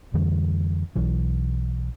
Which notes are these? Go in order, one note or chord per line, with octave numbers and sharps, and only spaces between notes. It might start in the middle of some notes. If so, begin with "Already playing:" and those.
F2 D3 E3 G3
B1 E3 F#3